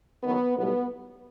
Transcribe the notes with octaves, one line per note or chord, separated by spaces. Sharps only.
F#1 F#2 D#3 F#3 B3
B1 A2 G3 B3